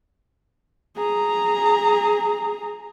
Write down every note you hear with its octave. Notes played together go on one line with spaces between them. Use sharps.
G#4 A#5